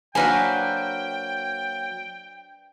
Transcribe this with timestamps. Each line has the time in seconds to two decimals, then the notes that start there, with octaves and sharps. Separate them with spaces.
0.15 F#3 A#3 D4 B4 C5 G5 G#5